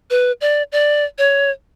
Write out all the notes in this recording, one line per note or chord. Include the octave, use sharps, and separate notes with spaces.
B4
D5
D5
C#5